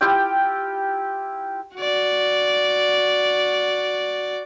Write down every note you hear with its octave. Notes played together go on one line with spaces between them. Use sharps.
E4 F4 G4 G5
F#4 D5